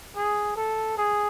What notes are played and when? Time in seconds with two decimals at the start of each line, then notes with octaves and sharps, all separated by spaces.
0.16 G#4
0.57 A4
0.98 G#4